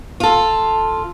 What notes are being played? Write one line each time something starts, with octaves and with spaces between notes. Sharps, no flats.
F4 A4